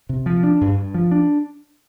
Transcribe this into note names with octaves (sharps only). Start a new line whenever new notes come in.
C3
F3
D4
G2
G2
F3
D4